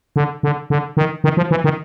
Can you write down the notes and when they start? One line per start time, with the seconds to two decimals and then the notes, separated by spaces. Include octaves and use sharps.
0.16 D3
0.43 D3
0.70 D3
0.97 D#3
1.24 D#3
1.37 F3
1.51 E3
1.64 D#3